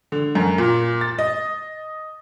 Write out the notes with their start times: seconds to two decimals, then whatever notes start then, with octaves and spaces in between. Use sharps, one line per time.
0.12 D3
0.35 F#2
0.58 A#2
1.01 A6
1.19 D#5